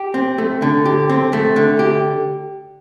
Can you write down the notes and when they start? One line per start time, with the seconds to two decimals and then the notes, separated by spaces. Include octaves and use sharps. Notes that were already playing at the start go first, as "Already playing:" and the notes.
Already playing: G4
0.14 C4
0.38 A3
0.62 D3
0.85 G4
1.09 C4
1.33 A3
1.56 D3
1.79 G4